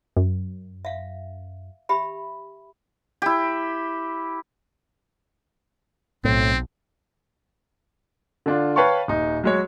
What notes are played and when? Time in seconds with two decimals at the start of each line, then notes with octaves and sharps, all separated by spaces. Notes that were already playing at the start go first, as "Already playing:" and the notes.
0.17 F#2
0.85 E5 F5
1.89 G4 E5 B5
3.22 E4 G4
6.24 B1 A2 C4
8.46 D3 D4 F4
8.76 B4 C#5 F5 G5 A5 C#6
9.08 D#1 D#4
9.44 F#3 G#3 C#5